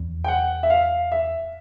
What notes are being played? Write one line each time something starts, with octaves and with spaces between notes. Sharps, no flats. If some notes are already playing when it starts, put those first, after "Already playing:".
Already playing: E2
G5
F#5
E5
F5
E5